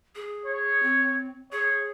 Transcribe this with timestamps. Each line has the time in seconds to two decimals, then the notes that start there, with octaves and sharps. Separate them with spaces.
0.15 G#4
0.46 C#5
0.82 C4
1.52 G#4 C#5